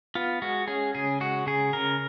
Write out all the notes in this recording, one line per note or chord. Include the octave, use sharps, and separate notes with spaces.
B3 F4
G#3 F#4
C#4 G#4
C#3 G#4
G#3 F#4
C#3 G#4
C#3 A#4